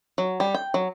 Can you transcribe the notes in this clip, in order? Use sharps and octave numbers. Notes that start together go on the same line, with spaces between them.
F#3
G3
G5
F#3